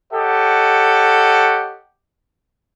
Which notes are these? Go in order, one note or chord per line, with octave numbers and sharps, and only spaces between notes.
G4 A4 C#5 D#5 F#5